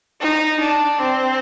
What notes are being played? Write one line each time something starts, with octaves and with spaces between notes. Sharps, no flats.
D#4
D4
C4